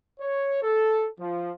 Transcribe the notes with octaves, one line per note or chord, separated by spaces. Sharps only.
C#5
A4
F3